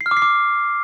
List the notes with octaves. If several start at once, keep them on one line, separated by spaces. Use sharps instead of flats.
C7
F6
D6
C7
D6